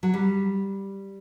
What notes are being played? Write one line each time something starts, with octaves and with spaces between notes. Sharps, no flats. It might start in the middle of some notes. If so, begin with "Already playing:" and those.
F#3
G3